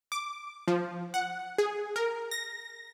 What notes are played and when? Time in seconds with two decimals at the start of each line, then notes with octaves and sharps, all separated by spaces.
0.12 D6
0.68 F3
1.14 F#5
1.58 G#4
1.96 A#4
2.31 A#6